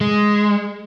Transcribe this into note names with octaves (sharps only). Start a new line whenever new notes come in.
G#3